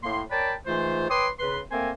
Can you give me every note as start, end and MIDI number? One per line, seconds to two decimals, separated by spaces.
0.03 0.22 45
0.03 0.22 58
0.03 0.22 84
0.31 0.53 70
0.31 0.53 73
0.31 0.53 74
0.31 0.53 79
0.31 0.53 81
0.31 0.53 83
0.67 1.09 44
0.67 1.09 52
0.67 1.09 57
0.67 1.09 65
0.67 1.09 72
1.10 1.28 71
1.10 1.28 73
1.10 1.28 79
1.10 1.28 84
1.10 1.28 86
1.10 1.28 87
1.39 1.59 49
1.39 1.59 71
1.39 1.59 84
1.72 1.91 57
1.72 1.91 58
1.72 1.91 60
1.72 1.91 70
1.72 1.91 72
1.72 1.91 80